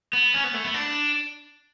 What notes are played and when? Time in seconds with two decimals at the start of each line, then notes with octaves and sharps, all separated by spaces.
0.13 B3
0.34 C#4
0.44 B3
0.54 A3
0.65 B3
0.74 D4